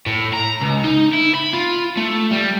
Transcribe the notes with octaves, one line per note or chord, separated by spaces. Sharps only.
A2
A#5
C#2
D#4
E4
B5
F4
A3
G3